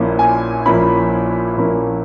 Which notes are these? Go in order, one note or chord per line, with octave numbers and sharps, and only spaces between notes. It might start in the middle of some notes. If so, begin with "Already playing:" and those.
Already playing: A#1 A#2 A#3 C#4 E4
G#5
A#1 A#2 A#3 C#4 E4 B5
A#1 A#2 A#3 C#4 E4